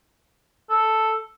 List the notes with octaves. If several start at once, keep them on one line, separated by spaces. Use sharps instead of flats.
A4